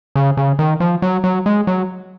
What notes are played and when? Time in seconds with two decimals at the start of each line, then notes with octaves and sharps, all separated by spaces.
0.15 C#3
0.37 C#3
0.59 D#3
0.80 F3
1.02 F#3
1.24 F#3
1.46 G#3
1.67 F#3